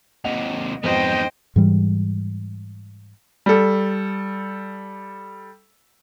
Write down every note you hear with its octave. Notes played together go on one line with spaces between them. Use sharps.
D#2 C3 D#5 F#5 F7
F2 G#2 B3 D#4 C5 D#5 G5
G#2 E3 G3
G3 A4